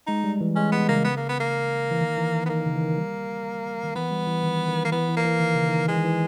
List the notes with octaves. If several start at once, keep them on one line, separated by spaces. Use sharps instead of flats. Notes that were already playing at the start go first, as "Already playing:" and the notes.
G#3 D#4
G3
E3
G#3 C#4
G#3 B3
C#3 A#3
B3
A#3
B3
A#3
E3
D#3
E3
D#3
B3
D#3 A#3
D#3
C#3
E3
D#3
G3
D#3
E3 B3
G3
E3
D#3
D#3
A#3
E3 B3
E3
A#3
E3
D#3
C#3
D#3
E3 G#3
D#3
E3